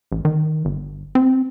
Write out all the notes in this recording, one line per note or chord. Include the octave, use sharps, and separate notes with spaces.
A1
D#3
G1
C4